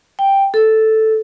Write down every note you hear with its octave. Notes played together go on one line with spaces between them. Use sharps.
G5
A4